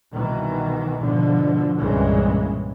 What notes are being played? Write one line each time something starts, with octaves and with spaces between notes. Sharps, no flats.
C2 B2 D#3 E3
G#2 B2 D3 F3
C2 G2 A#2 C#3 E3 G#3